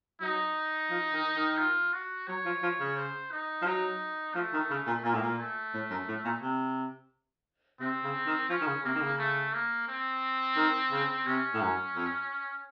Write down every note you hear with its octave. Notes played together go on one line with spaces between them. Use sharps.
F#3 D#4
F3
D#3
D#3
F4
F#4
F#3 C#5
F3
F3
C#3
C5
D#4
F3
F#3 D#4
F3 A3
D#3
C#3
A#2
A#2 A#3
A2
A#2
A3
A2
F#2
A2
A#2
C3
C3 C4
C#3
D#3
F3 C#4
D#3
C#3
C3 A#3
D#3
C#3
A3
A#3
C4
D#3
C#3
C3 C#4
A2
F#2
F2